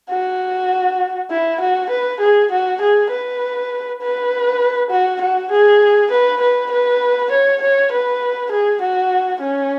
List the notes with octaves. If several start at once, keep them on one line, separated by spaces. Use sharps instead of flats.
F#4
E4
F#4
B4
G#4
F#4
G#4
B4
B4
F#4
F#4
G#4
B4
B4
B4
C#5
C#5
B4
G#4
F#4
C#4